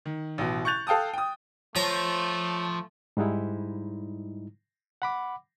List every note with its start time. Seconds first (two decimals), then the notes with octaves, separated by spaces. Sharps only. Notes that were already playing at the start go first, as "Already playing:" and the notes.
0.06 D#3
0.38 A1 B2
0.65 C#6 F#6 G6 A6 F7
0.87 A4 F5 G5 A5 D#6
1.13 G5 D#6
1.76 F3 A3 C#5 A#5
3.17 G#2 G3 G#3 D#4 E4
5.02 F#5 B5 D6